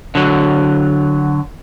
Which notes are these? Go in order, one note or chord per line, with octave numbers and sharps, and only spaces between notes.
D3 F#3